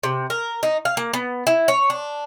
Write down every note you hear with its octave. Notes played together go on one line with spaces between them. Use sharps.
C3
A#4
D#4
F5
A#3
B3
E4
C#5
D4